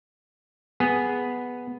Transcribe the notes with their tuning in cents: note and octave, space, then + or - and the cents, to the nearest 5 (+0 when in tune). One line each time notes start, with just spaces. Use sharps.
B3 +0 G#4 +0